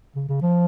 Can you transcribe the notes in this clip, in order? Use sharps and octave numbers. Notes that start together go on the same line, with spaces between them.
C#3
C#3
F3